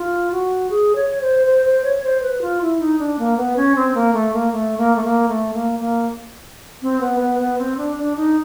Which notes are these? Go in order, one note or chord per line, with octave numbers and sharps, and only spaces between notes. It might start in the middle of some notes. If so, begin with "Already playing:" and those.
Already playing: F4
F#4
G#4
C#5
C5
C5
C5
C#5
C5
B4
F4
E4
D#4
D4
A#3
B3
C#4
C4
A#3
A3
A#3
A3
A#3
A3
A#3
A3
A#3
A#3
C4
B3
B3
B3
C4
D4
D4
D#4